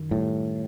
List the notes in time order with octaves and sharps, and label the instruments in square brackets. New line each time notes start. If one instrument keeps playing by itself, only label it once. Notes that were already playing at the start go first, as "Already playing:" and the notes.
Already playing: [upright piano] F#2 D#3
[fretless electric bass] A2 [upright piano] G3